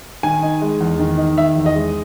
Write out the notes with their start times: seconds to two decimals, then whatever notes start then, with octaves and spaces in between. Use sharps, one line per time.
0.23 D#3 G#5
0.42 D#4
0.62 G#3
0.81 E2
0.99 D#3
1.18 D#4
1.37 D#3 E5
1.56 E2
1.66 D#5
1.75 G#3